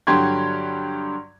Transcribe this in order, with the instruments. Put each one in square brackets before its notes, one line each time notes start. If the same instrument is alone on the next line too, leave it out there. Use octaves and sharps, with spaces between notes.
[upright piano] G2 D3 F#3 G4 C6 G#6